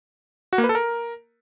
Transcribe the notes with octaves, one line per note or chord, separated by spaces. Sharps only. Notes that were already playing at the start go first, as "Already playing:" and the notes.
F#4
A#3
B4
A4
A#4